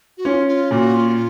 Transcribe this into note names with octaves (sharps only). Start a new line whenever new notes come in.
F#4
C#4 F4
F4
A#2 F#4
F4